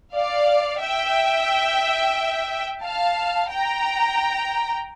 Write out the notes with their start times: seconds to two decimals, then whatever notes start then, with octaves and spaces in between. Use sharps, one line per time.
0.15 D5 F5
0.82 E5 G5
2.84 F5 A5
3.50 G5 A#5